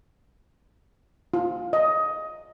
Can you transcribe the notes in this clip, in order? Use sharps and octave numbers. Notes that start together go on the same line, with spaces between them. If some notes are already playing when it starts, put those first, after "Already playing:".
F4
D#5